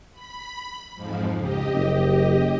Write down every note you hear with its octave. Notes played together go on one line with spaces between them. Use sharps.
B5
F2 G#2 F3
C#2 G4 D#5
F#1